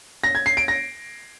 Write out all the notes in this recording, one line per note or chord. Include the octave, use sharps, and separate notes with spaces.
A#6
G#6
C7
D7
A#6